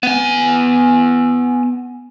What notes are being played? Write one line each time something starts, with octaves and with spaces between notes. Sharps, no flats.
B3 G#5